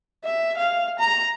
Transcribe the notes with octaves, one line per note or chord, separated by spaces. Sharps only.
E5
F5
A#5